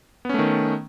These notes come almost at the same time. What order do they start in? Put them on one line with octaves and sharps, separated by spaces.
B3 C#4 A3 D#3